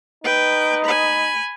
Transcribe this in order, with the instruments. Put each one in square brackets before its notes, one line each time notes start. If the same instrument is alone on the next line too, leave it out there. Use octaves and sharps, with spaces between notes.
[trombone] D#4 [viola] B4 G5
[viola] G#5 B5